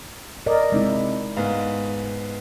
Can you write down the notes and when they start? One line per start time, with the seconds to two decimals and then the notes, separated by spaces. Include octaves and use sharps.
0.46 A#4 D5 D#5
0.72 C3 G#3 D#4 E4
1.37 G#2 B3 F5